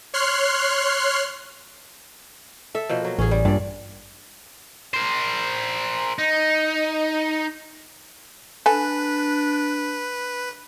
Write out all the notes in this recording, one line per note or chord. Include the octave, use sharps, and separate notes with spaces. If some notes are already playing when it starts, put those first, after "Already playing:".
C#5 C6 F6 F#6 C7
A4 E5
B2 F3 A#3
F#3
A1 C#4 G#4
G3
G2 A#2 D5
A#4 C5
D#4
D4 A4 B4 G#5